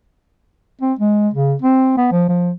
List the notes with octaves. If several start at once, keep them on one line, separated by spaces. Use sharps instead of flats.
C4
G#3
C#3
C4
B3
F3
F3